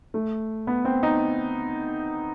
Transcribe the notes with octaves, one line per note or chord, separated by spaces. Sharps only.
A3
B3
C4
D#4